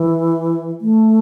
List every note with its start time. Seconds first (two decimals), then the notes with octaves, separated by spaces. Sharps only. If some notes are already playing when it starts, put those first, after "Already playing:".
Already playing: E3
0.81 A3